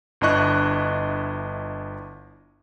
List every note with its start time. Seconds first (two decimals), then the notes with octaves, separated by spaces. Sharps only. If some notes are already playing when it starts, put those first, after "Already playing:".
0.21 G1 D4 E4 D#5 C#6 F#6